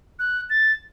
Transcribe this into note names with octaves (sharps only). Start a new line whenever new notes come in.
F#6
A6